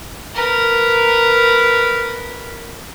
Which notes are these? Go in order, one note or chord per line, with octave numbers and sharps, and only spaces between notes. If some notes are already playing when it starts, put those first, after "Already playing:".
A#4 B4